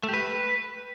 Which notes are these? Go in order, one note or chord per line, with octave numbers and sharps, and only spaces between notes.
A3
G4
B4